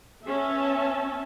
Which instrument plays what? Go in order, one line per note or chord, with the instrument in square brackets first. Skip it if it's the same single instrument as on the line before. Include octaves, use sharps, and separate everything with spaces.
[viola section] B3 C#4 E5 A5